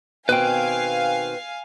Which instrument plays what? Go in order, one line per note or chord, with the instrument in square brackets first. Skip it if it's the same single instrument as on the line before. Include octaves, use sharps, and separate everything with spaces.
[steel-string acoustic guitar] B2 D#3 C4 [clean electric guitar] B4 G5 [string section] F5 G#5